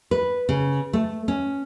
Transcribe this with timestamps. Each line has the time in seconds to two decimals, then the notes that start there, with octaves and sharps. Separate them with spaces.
0.11 B4
0.49 C#3
0.93 A3
1.28 C#4